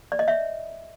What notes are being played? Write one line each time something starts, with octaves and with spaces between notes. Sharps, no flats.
D5
D#5
C#5 E5